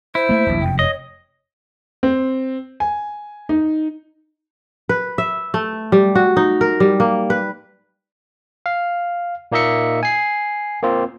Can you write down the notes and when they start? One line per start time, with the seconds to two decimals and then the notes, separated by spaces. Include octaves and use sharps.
0.15 E4 C5
0.29 A3 A#3
0.46 D#1 A#1
0.61 F1 F#2 G5
0.79 C#5 D#5
2.03 C4
2.80 G#5
3.49 D#4
4.89 B4
5.18 E5
5.54 A3
5.92 G3
6.15 F#4
6.37 D#4
6.61 A#4
6.80 G3
7.00 A#3
7.30 B4
8.66 F5
9.52 A#2 A#3 D#4 D#5 E5 C#7
10.03 G#5 C7
10.83 A#3 C4 F4